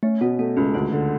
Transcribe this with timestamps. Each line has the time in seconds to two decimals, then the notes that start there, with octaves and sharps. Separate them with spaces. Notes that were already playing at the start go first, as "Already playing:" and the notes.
0.03 A3 C#4
0.21 B2 B3
0.39 A3 B3
0.57 C#2 C#4
0.74 D2 D4
0.92 D3